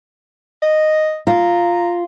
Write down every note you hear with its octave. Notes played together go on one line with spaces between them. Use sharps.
D#5
F4 A#5